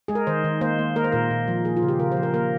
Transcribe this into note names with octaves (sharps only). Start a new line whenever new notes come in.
G#3 G#4
A#4
D#3 C5
D#3
A#3 C5
A#3
A#3 A#4
C5
A#2 A#4
A#2
F3
A#3 G#4
F4
C#3
G4
C#3 A#4
C5
F3
A#4
A#3 A#4